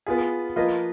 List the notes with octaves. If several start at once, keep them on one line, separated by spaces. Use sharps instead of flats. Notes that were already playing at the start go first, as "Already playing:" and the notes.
B3 F4 G#4
F3 A#3 F4 B4 D#5